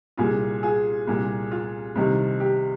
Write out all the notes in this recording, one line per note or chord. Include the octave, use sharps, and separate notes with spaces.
C2 A#2 F4 G#4
F4 G#4
C2 A#2
F4
C2 C3 D#3
G4